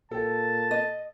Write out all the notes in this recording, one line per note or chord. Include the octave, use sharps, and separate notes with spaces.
A#2 A4 G5 A5
D#5